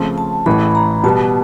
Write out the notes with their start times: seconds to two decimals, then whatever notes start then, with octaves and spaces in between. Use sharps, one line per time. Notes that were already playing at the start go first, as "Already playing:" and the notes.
Already playing: C#3 F3 A3 C4
0.18 A5
0.46 A1 A2 E3 A3 B5
0.75 A#5
1.03 B2 G3 B3 A5